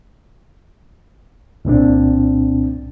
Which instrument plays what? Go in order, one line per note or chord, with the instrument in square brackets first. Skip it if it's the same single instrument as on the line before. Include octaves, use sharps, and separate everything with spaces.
[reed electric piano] C2 A#2 C4 D4